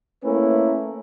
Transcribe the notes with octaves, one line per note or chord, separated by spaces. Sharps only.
A3 A#3 C#4 E4 A#4 B4